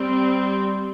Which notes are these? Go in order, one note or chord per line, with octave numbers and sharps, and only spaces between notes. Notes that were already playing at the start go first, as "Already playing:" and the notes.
Already playing: G3 C4